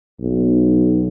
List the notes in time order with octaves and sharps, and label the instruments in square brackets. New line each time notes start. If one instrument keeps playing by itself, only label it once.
[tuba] B1